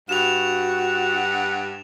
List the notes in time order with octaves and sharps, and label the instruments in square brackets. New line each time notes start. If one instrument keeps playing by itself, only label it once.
[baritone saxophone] G2 [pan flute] F#4 [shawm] F#5 [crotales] E7 F7